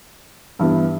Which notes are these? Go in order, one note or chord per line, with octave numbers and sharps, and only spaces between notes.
G2 E3 B3